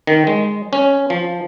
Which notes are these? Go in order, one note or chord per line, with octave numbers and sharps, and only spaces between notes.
D#3
G#3
C#4
F3